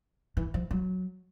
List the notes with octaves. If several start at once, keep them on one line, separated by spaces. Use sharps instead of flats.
E3
F3
F#3